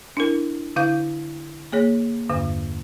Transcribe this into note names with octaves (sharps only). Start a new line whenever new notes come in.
D4 E4 A#4
D3 E4 F5 G6
A#3 G#4 C#5
E2 G2 D3